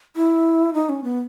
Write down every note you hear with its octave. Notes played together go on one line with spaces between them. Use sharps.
E4
D#4
C#4
B3